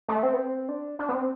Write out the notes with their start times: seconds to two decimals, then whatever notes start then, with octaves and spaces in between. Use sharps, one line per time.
0.08 A3
0.23 C4
0.33 B3
0.38 C4
0.69 D4
0.99 D4
1.09 B3
1.13 C4